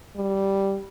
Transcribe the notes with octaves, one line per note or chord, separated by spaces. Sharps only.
G3